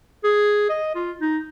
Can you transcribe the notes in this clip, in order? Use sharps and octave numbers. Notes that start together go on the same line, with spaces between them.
G#4
D#5
F4
D#4